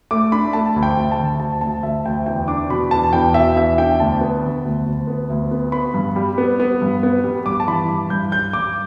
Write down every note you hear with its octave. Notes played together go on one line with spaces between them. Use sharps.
A3 D6
D4 B5
A3 A5
D2
G5
D2
A5
D3
D2 A5
D2 A5
D2 E5
D2 G5
E2 G5
D4 D6
B2 B5
E2 A5
E2 G5
B2 E5
E2 E5
D4 G5
D2 A5
B3
D3
D2
D2
B3
D2
B3
B3 B5
G2
G3
B3
B3
G2
B3
G3
G2 D6
A5
E3 B5
G2 D6
G2 G6
G2 G6
G2 D6